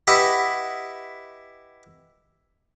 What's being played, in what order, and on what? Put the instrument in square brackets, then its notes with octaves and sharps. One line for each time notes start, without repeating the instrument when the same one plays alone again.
[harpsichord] E4 G4 B4 D#5 E5 F#5